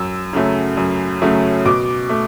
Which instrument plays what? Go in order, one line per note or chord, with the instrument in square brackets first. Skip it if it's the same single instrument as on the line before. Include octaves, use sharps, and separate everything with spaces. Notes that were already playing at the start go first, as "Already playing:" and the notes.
Already playing: [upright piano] F#2 E6
C#3 F#3 A3
F#2
C#3 F#3 A3
B2 D6
A3